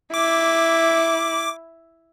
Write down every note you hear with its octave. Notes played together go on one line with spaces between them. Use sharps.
E4 D6